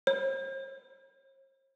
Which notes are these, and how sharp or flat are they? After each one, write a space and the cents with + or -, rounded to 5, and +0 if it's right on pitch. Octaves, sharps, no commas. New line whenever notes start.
C5 +45